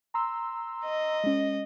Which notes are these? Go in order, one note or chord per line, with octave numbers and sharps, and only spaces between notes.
A#5 C6 E6
D#5
G#3 C#4